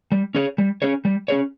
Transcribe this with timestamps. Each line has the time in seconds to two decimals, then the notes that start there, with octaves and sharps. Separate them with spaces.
0.12 G3
0.35 C#4 G#4 C#5
0.58 G3
0.82 C#4 G#4 C#5
1.05 G3
1.28 C#4 G#4 C#5